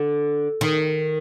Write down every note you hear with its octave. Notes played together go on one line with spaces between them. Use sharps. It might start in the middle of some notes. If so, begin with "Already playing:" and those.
Already playing: D3
D#3